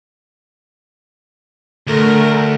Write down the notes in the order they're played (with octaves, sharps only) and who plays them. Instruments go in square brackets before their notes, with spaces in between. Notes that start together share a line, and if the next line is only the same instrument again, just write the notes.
[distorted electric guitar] D2 [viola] A3 A#4